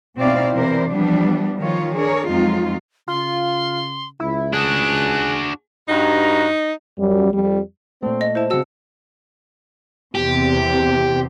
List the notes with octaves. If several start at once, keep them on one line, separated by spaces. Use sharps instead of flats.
B2 C4 D#4 E4 D5 F5
C3 E3 E4 A#4 C5 D5
E3 F3 G3 B3 D4
D#3 F3 F4 C#5
D4 G#4 A#4 C#5
F2 F#3 G#3 C4 D#4 F4
C#3 F4 C6
C#2 E4
D4 F#4 G#4 F#6
G2 D#4 F#4 A#5
F#2 G3
F2 G3
A#2 A3 C4
D#5
E4 C5 A5
C#3 C4 F#4 G#4 A5 E6
E2 C3 G4